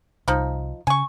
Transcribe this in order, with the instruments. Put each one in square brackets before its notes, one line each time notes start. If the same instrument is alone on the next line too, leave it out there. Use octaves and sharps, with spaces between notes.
[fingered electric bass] C2 [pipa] F3 D#4
[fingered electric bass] C#3 [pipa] G#5 C#6